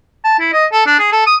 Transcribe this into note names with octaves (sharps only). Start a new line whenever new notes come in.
A5
E4
D#5
A4
D4
G#4
A4
D#6